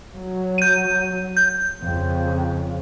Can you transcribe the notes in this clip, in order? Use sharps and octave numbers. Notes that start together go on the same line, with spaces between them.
F#3
G6 D#7
G6
F2 C#3